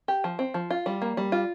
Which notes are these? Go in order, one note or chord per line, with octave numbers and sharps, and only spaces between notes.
G4
F3
C4
F3
F4
G3
A#3
G3
F4